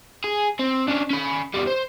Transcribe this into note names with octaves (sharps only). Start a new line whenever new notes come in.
G#4
C4
C#4 D4
C#4 B5
E2 G3
C5